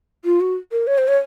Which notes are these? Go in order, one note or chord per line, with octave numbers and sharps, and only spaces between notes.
F4
F#4
A#4
C#5
C5
C#5